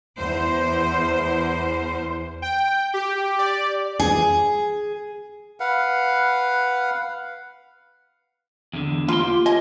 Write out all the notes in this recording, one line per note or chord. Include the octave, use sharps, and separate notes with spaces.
E2 C5
G5
G4
D5
G#4
B4 F5 F#5
E2 D3
A#3 F4 C6
G4
D#5 G#5